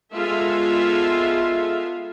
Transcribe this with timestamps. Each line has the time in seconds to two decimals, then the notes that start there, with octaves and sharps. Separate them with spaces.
0.15 G#3 B3 F4 A4 E5 F5